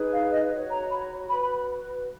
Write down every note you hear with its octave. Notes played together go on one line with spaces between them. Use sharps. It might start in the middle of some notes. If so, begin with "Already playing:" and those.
Already playing: D#4 G#4 B4
F5
D#5
F#4 C#5
A#5
B5
C#5
F#4 B4 B5
B5